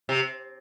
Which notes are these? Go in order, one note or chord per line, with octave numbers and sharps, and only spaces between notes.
C3